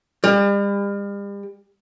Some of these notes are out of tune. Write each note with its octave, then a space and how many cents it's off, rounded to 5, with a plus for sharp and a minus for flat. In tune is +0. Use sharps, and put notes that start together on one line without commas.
G3 +40